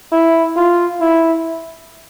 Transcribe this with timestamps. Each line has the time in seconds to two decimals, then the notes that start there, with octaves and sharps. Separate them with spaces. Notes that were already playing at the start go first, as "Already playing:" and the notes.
0.12 E4
0.56 F4
1.00 E4